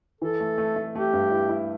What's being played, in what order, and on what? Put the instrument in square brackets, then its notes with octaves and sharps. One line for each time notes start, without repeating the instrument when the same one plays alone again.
[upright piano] E3 [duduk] A4
[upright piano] A3
A3
A3
[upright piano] A3 [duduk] G4
[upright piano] G2
E4
E4